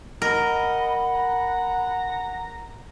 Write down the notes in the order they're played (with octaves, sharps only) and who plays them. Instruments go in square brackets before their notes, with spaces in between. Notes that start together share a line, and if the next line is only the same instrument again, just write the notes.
[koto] A#4 [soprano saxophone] D#5 [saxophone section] F#5 [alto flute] B5
[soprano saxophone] A#5